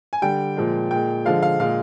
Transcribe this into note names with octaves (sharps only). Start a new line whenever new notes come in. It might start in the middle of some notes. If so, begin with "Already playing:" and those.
G#5
D3 G3 G5
A#2 F3 G#3
A#2 G#3 G5
D3 F3 G#3 F5
F5
A#2 G#3 F5